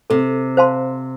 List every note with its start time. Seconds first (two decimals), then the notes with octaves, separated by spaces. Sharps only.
0.10 C3 A4
0.57 C5 F5 A5 C6